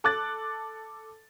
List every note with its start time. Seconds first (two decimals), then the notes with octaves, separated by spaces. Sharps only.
0.04 A4 D6 F#6 A6